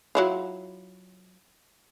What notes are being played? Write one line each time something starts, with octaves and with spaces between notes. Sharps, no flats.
F#3 E4 F4